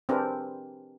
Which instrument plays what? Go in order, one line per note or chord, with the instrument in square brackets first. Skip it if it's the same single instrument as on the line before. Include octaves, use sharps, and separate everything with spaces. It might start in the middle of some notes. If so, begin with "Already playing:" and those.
[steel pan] C4 D4 G4 G#4 A#4 B4